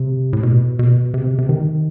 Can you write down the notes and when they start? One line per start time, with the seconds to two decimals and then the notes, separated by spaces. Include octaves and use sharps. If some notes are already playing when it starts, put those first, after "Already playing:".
Already playing: C3
0.33 A2
0.43 B2
0.79 B2
1.14 C3
1.38 C3
1.49 D#3